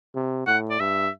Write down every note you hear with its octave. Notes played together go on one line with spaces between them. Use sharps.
C3
A2 F#5
D5
G2 E5